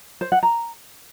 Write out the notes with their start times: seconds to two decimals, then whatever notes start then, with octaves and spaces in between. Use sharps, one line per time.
0.21 C5
0.32 F#5
0.43 A#5